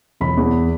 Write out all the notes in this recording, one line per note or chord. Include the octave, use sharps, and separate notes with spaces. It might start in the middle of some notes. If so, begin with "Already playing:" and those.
E1 B5
E2